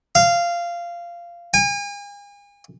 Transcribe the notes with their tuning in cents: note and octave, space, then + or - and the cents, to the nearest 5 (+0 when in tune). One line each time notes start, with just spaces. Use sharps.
F5 -15
G#5 -40